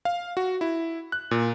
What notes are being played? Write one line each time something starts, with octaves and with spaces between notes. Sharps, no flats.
F5
F#4
E4
F#6
A#2